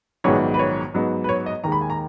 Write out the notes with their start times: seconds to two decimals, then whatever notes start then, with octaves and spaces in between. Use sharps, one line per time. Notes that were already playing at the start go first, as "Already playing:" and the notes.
0.24 A#1 G#2 D#3 F#3 B3 C#5
0.54 B4
0.59 C#5
0.94 G#2 F#3 B3 D#4
1.24 B4
1.29 C#5
1.46 D#5
1.64 D#2 D#3 G#3 A#5
1.72 B5
1.81 G#5
1.90 A#5